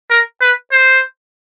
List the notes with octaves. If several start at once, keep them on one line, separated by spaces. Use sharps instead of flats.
A#4
B4
C5